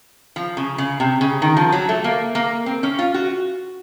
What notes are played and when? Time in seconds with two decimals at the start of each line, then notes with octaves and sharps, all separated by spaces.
0.36 F3
0.57 C#3
0.78 C#3
1.00 C3
1.21 C#3
1.42 D#3
1.57 F3
1.72 F#3
1.89 A3
2.04 A#3
2.35 A#3
2.66 C4
2.83 C#4
2.99 F4
3.14 F#4